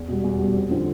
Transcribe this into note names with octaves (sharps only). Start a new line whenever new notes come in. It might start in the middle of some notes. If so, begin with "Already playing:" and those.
Already playing: E2
B2 G3
E2
B2 G3
F2
D3 F3 C4